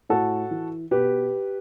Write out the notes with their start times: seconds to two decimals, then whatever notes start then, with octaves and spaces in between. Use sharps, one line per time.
0.09 A2 F#4 A4
0.51 E3
0.91 B2 G4 B4